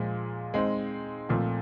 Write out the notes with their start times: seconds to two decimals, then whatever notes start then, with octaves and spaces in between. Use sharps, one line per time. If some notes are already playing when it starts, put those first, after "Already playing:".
Already playing: A#2 F3 G#3
0.54 G#3 C4 D#4
1.29 A#2 F3 A3 C4